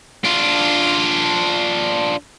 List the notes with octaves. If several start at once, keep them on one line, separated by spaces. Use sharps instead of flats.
D4 F4